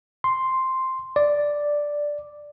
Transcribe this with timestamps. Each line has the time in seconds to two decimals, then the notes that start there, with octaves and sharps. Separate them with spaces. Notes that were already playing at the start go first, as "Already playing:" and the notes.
0.24 C6
1.16 D5